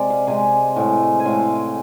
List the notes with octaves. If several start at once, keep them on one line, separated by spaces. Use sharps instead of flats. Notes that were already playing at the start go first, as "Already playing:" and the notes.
Already playing: C3 G#3 D5
F5
C3 G#3 G#5
A2 G#3
G#5
A2 G#3 F5